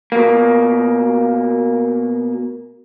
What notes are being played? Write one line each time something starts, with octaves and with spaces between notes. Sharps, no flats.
B2 A#3